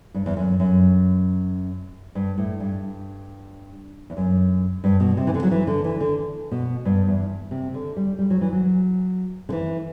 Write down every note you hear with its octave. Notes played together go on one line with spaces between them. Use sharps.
G2
E2
F#2
F#2
G2
A2
G2
E2
F#2
G2
B2
C3
E3
D3
F#3
E3
D3
E3
D3
B2
G2
E2
C3
D3
G3
G3
F#3
E3
F#3
D3
E3